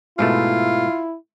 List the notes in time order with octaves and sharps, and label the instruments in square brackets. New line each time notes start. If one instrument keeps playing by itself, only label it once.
[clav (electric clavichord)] G#2 B2 A3 [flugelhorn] E4 [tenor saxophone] F4